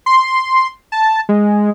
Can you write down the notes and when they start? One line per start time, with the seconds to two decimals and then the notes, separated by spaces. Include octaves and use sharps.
0.06 C6
0.92 A5
1.29 G#3